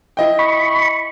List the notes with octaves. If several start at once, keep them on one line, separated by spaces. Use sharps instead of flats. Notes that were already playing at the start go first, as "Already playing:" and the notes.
E4 D#5 G5
B5 C#6